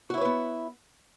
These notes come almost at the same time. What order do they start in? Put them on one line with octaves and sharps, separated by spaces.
F#4 E4 C#5 B4 B3